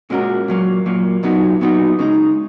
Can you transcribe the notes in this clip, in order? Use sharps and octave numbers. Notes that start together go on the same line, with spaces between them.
A#2 G#3 C#4 F#4 A#4
A#2 F#3 A#3
A#2 F#3 A#3
A#2 F#3 B3 D#4 F#4
A#2 F#3 B3 D#4 F#4
C#3 G#3 D#4